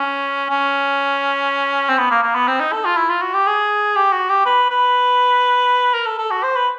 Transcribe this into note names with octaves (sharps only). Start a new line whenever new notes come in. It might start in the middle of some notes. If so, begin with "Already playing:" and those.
Already playing: C#4
C#4
C4
B3
A#3
A#3
B3
C4
D#4
A4
F4
E4
F4
F#4
G4
G#4
G4
F#4
G4
B4
B4
A#4
A4
A4
F#4
C5
B4